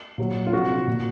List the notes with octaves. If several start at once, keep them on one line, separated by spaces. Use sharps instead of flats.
A#2 F#3
F4
C3 F3 F#4
A#2 F3